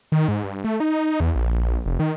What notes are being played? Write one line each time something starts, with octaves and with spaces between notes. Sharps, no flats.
D#3
G#2
G2
A3
D#4
E2
A#1
F1
D#3